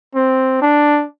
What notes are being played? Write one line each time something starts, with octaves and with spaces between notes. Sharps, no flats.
C4
D4